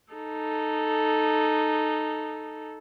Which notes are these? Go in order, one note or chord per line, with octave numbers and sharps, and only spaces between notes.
D#4 A4